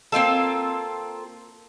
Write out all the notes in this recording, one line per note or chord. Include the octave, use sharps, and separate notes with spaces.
A#3 C4 F4 A4